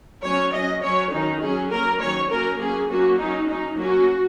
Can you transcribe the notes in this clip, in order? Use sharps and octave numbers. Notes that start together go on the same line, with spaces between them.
F#3 C#4 C#5
F#3 C#4 D#5
F#3 C#4 C#5
D#3 F#3 C#4 D#4
F#3 C#4 G#4
F#3 A#3 C#4 A#4
D#3 F#3 C#4 C#5
F#3 A#3 C#4 A#4
F#3 A#3 C#4 G#4
F#3 A#3 C#4 F#4
F#3 C#4 D#4
F#3 C#4 D#4
F#3 A#3 C#4 F#4